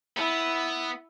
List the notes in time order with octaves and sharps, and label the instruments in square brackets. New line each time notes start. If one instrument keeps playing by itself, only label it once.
[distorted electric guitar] B3 [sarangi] E4